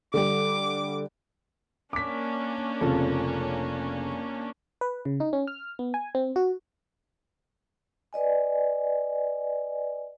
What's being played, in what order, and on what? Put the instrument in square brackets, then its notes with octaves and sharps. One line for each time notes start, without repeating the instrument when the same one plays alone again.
[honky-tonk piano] D3 G3 [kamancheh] D6
[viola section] A#3 C#4 D4 [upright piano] D6 B6
[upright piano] F1 C#3 [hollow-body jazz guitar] F4 A4
[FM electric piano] B4
C#3
D#4
C#4
F6
B3
G#5
C4
F#4
[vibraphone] B4 D5 D#5 G#5